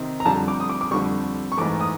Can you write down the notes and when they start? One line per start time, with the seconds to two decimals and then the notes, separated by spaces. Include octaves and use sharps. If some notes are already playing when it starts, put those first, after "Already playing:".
Already playing: C3 D#3 C4
0.20 A#5
0.25 F2 D3 G3 A5
0.48 D6
0.60 D#6
0.69 D6
0.81 D6
0.91 F2 D3 G3 C#6
1.52 C#6
1.57 G#2 E3 A3 D6
1.80 D#6